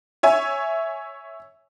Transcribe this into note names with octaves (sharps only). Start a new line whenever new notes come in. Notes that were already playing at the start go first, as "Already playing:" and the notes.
C#5 E5 G#5